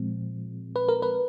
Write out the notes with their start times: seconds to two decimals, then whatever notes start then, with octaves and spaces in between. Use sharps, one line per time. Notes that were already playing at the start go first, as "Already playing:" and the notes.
Already playing: A#2 F3 G#3 C4
0.76 B4
0.88 A#4
1.02 B4